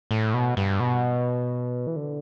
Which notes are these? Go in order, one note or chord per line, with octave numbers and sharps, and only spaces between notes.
A2
B2
G2
B2
E3
D3